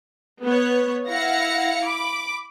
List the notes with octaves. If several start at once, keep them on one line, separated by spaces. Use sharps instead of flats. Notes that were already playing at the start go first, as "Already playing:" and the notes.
B3 C#5
E4 F5 F#5 A#6 C#7
B5 D6